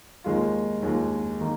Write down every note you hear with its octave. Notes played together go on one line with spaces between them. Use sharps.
D#2 D#3 G#3 F4
D#2 D#3 G#3 F4
D#3 A#3 D#4